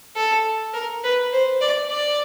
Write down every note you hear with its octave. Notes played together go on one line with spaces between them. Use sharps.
A4
A#4
B4
C5
D5
D5